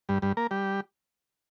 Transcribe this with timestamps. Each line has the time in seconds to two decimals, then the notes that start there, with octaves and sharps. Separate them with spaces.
0.09 G2 G3
0.22 G2 G3
0.37 A#3 A#4
0.51 G3 G4